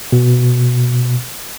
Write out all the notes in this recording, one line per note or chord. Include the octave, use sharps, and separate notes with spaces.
B2